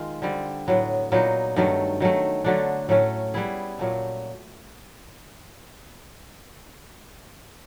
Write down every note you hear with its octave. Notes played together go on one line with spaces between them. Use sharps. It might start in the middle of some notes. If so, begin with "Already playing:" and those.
Already playing: D#3 G#3 F4
D3 G3 C4
A2 F#3 B3
A#2 F#3 B3 D#4
G2 D#3 F#3 A3
D#3 F#3 A3
D3 F#3 A3 D4
A2 F#3 A3 C#4
G3 B3 E4 G#4
A#2 F#3 A3